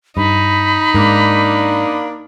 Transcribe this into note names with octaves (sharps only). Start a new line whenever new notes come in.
G2 D#4 B5
G#2 A#3 D4